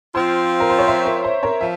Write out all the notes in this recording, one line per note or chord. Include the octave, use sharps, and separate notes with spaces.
F3 C4 F4 C5
A#4
C5
C#5
C5 E5
A#4
C5
A#4 C#5
F3 E5